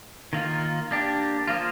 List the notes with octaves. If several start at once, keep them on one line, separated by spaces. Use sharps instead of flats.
D#3 A#3 F4
A#3 D4 G4
F3 A#3 F4